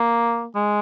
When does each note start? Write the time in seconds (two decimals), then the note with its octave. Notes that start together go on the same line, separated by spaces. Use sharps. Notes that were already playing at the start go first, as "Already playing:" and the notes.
Already playing: A#3
0.55 G#3